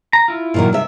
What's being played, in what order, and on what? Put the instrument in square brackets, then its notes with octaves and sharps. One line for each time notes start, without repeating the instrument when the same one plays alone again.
[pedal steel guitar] A#5
E4 F4
[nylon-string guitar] A#2 D#3 F#3
C3 E5